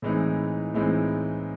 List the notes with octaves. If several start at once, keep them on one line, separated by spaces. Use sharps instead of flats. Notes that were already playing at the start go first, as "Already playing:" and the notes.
A2 E3 G#3 C4 D#4
A2 E3 G#3 C4 D#4